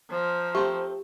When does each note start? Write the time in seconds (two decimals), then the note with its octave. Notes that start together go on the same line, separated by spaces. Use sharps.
0.10 F3 C5 A#5
0.55 A3 C4 G4